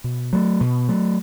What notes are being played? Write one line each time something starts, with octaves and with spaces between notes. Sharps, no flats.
B2
F#3 A3
B2
F#3 A3